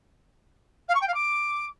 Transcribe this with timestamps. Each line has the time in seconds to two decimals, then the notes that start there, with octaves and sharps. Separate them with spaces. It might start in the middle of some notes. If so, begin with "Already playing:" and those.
0.88 F5
0.95 C#6
1.01 G5
1.07 F5
1.14 D6